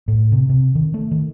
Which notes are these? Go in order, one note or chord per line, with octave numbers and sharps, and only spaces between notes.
A2
C3
C3
D#3
A3
D#3